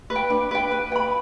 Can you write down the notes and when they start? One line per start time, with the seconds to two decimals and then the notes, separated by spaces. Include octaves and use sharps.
0.10 B4
0.16 G5
0.30 D4
0.51 B4 G5
0.71 B4
0.92 G5
0.96 B5